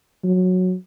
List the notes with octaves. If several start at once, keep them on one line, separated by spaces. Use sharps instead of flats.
F#3